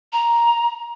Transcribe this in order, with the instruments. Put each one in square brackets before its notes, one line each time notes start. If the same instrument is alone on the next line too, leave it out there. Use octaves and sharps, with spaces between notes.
[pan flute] A#5